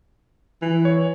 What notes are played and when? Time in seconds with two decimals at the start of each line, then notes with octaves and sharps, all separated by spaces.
0.62 E3
0.85 C#5